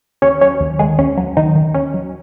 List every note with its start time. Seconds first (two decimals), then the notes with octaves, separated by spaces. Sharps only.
0.22 D#2 C#4 C#5
0.41 F#3 C#4 C#5
0.60 D#2
0.79 D#3 G#3 G#4
0.99 D#2 C#4
1.17 F#3
1.37 D#2 D#3 D#4
1.55 D#3
1.74 D#2 C#4
1.94 F#3